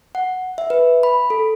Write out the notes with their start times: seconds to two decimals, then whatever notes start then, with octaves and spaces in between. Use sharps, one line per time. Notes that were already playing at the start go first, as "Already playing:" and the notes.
0.15 F#5
0.58 E5
0.70 B4
1.03 B5
1.30 A4